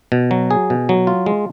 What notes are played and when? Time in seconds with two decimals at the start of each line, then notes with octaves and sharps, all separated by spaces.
0.12 B2
0.31 F#3
0.51 G#4
0.70 B2
0.89 F#3
1.07 F4
1.26 G#3